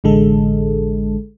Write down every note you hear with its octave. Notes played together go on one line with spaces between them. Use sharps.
A1 D3 G#3 A4